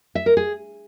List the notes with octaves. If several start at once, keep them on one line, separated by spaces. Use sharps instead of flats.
E5
A#4
G#4